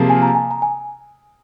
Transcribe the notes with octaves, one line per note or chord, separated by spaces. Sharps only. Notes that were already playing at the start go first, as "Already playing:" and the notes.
Already playing: C3 F3 A#3 F4 G#4
G#5
A#5
G#5
A#5
G#5